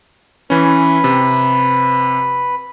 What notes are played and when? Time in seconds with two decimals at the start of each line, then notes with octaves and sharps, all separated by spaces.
0.50 E3 C#4 B4
1.04 C3